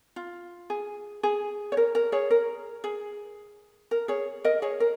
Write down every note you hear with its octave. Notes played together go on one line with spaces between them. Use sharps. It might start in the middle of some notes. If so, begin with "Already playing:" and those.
F4
G#4
G#4
C#5
A#4
A#4
G#4 C#5
A#4
G#4
A#4
G#4 C#5
A#4 D#5
G#4 C#5
A#4